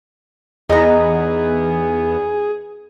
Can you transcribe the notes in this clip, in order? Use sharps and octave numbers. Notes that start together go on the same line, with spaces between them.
E2 B3 D#4 G#4 A#5